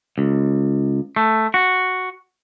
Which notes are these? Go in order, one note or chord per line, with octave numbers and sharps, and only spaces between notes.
C#2
A3
F#4